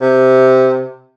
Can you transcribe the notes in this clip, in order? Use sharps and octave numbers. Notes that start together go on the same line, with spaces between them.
C3